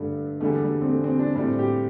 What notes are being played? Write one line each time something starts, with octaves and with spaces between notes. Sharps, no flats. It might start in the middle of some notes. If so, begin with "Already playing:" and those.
Already playing: G2 D3 G3 A3
E2 D3 G3 A3
G3
C4
A3
C4
D4
A2 G3 C4
G4